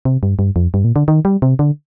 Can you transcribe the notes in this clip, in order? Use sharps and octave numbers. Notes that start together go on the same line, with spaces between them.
C3
G2
G2
F2
G2
A#2
D3
D#3
G3
C3
D3